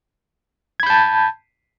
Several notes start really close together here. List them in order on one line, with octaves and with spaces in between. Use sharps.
G#6 B5 G6 A5